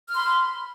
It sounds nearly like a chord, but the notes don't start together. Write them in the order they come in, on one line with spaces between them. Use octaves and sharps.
F6 C6 B5